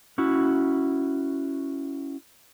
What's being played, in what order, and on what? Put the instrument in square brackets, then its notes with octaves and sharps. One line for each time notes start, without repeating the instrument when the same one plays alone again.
[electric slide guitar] C#4 E4 F#4